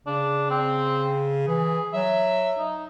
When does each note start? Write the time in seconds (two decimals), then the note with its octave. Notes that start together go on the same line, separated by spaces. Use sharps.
0.06 C#3 D4
0.50 C4
1.47 E3 G#4
1.93 F#3 E5
2.59 D#4